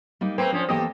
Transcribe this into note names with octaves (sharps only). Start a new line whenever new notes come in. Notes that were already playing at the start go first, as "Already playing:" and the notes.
G3 A#3 D#4
A3 A#3 C4 B4
F3 C#4 D4
E2 A#3 G4 A4 D#5